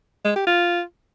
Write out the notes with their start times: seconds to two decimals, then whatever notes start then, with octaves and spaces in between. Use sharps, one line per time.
0.25 G#3
0.36 G4
0.47 F4